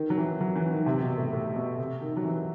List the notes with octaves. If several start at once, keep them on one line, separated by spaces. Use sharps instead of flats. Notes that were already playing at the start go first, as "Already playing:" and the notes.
Already playing: D#3
F#3
E3
F#3
E3
D#3
C3
B2
A2
A2
B2
C3
D#3
F#3
E3